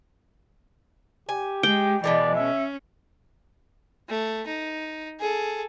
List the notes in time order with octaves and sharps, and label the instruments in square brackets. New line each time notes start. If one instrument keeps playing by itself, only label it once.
[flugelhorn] G4 [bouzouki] G#5
[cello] G#3 [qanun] G5
[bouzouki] B2 D3 G#3 [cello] E3 [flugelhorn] D5
[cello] C#4 [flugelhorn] E5
[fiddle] A3
D#4
G#4 A4